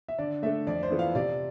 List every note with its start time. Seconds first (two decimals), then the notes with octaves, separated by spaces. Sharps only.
0.08 E5
0.18 D3 D5
0.42 A3 D4 A4 E5
0.67 F2 D5
0.83 C5
0.91 E3 B3 F4 A4
0.99 F5
1.15 C3 D5